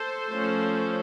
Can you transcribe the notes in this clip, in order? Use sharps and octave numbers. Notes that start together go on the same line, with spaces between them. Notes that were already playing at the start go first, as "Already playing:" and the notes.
Already playing: A4 C5
F3 A3 C#4